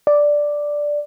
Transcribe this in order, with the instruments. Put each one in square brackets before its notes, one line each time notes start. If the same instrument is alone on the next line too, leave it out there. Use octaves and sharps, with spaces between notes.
[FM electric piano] D5